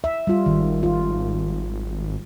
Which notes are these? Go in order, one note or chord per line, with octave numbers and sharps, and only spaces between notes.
E5
G3 F4
G#1 D#3
F4